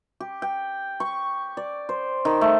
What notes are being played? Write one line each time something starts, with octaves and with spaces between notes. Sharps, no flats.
G4
G5
C#6
D5
C5
D#3
A3